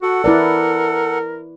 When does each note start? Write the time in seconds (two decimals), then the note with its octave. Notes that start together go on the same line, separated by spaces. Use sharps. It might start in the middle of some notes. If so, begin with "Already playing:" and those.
0.02 F#4 A4 F#5
0.24 E4 A#4 B4 D5